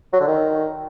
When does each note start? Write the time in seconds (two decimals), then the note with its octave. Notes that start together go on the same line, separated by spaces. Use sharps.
0.13 F#3
0.20 D3
0.27 D#3